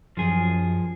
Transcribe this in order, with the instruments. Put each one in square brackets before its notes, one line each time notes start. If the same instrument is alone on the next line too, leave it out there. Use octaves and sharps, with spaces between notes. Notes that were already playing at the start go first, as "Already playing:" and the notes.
[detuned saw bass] F#2 [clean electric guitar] F3 G#4